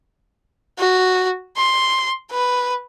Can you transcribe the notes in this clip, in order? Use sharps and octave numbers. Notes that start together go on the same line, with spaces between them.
F#4
C6
B4